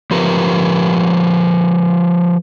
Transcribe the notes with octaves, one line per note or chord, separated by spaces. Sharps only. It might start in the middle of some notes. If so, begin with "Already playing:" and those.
F3 G4 A#4 B4